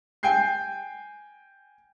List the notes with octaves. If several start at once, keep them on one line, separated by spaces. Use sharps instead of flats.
G5 G#5 G6 C7